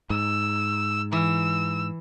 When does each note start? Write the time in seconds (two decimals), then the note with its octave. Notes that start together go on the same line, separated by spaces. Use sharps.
0.10 G#2 E6
1.13 E3 E6